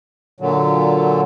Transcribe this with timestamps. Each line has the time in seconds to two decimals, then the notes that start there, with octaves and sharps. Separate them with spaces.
0.40 A#2 D3 F#3